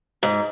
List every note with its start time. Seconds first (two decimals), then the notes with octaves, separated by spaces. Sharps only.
0.23 G#2